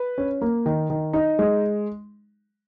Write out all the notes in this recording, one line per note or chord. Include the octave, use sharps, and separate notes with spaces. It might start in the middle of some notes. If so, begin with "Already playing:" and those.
Already playing: B4
C#4
A#3
D#3
D#3
D#4
G#3